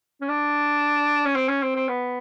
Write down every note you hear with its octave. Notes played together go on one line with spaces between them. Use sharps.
C#4
D4
C#4
C4
C#4
C4
C4
B3